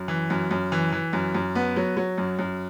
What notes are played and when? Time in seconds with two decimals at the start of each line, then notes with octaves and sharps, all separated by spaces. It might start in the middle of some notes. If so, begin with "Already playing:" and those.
Already playing: F#2
0.08 E3
0.30 F#2
0.51 F#2
0.72 E3
0.92 E3
1.13 F#2
1.35 F#2
1.55 B3
1.76 F#3
1.97 F#3
2.18 F#2
2.39 F#2